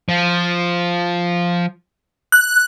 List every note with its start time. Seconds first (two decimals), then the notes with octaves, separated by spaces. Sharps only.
0.09 F3
2.32 F#6